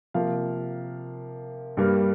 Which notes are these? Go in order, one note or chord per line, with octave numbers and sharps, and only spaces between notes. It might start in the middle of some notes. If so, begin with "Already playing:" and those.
C3 F3 A#3 F5
G2 G3 A#3